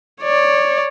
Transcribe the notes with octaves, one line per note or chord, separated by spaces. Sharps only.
C#5 D5